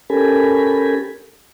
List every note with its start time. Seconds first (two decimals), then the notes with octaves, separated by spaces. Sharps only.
0.10 C#4 G4 A4 A#4 G#5 B5